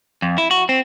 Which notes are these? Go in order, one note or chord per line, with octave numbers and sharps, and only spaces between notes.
F2
E4
F#4
C4